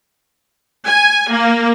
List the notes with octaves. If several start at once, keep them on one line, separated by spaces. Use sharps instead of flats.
G#5
A#3